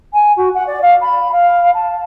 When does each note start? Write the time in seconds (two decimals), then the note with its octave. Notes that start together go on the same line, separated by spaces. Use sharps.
0.13 G#5
0.36 F#4
0.54 F#5
0.66 D5
0.81 F5
1.01 B5
1.31 F5
1.74 A5